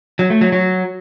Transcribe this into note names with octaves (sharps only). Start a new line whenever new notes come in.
F#3
A3
F#3
F#3